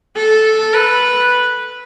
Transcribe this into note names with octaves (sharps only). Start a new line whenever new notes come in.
A4
B4